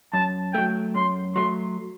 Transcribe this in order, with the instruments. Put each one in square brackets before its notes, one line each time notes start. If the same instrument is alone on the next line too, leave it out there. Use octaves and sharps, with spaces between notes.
[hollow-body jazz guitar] F#2 [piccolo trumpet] A5
[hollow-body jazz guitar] F#3 A3 [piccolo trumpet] G5
[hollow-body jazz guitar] F#2 [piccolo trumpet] C6
[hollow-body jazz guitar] F#3 A3 [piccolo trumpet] C6